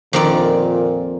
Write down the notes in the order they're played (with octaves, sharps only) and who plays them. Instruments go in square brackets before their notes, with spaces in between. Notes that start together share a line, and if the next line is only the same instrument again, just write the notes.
[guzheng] F2 D#3 D5 [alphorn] A#2